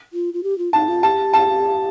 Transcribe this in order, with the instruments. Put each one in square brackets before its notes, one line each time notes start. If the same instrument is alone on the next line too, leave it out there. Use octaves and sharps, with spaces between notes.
[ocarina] F4
F4
G4
F4
[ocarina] D#4 [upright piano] A5
[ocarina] F4
[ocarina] G4 [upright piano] A5
[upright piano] A5